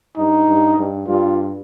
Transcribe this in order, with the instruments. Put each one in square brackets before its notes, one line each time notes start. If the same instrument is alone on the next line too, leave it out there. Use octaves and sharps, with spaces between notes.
[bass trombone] G2 [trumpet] D#4
[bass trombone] G2
G2
[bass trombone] G2 [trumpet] F4